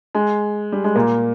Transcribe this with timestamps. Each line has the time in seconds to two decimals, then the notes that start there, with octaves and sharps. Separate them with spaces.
0.15 G#3
0.72 G3
0.84 G#3
0.95 A#2 A#3